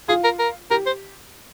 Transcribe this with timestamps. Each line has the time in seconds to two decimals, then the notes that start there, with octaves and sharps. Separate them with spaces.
0.08 F4 G#4
0.24 A#4
0.39 A#4
0.71 G4 A#4
0.86 C5